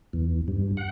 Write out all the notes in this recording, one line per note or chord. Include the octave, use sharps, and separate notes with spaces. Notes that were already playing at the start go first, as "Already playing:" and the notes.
E2
G2
F#5